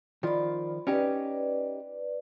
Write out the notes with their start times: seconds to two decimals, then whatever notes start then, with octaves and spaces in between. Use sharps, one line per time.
0.23 D#3 F3 F4 D5 B5
0.87 C#4 D#4 G4 B4 D5